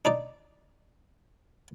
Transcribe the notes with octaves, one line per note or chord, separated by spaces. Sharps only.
D4 D#4 D5